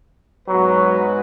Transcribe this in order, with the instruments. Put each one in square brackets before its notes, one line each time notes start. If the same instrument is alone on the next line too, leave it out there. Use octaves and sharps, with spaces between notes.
[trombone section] G#2 G#3 B3 F#4 B4 [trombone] F#3